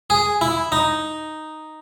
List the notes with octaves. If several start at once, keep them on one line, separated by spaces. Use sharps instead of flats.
G#4
E4
D#4